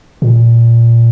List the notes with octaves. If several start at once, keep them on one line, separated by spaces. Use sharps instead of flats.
A#2